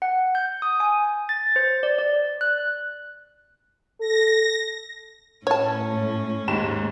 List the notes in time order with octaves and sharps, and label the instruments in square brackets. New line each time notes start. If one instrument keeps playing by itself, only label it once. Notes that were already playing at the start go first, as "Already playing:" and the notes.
[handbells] F#5
G6
D#6
G#5
A6
C5
D5
D5
F#6
[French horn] A4 [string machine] A#6
[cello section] A2 [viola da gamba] C#4 [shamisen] C#5 A5
[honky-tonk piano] D#2 G#2 E7